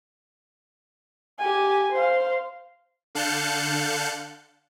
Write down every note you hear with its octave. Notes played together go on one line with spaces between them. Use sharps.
G4 G#5
C5 F5
D3 F5 A5 F#6 G6 C#7